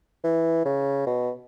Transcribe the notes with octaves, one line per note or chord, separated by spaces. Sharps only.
E3
C#3
B2